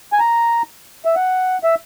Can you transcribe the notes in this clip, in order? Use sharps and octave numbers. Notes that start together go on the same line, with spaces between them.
G#5
A#5
E5
F#5
E5